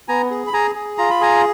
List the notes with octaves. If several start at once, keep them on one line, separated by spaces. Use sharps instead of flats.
B3 G#5 A#5
G#4
B5
G#4 G#5 A#5
G#4
F4 A#5
B5
G#4 G#5 A#5